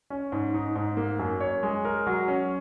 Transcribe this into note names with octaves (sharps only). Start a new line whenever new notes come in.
C#4
G#2
D#4
G#2
A#3
F#2
C#5
G#3
A#4
F#3
C#4